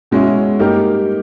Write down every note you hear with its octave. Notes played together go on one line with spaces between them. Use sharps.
B2 G#3 C#4 E4
G3 A#3 D#4 G4 A#4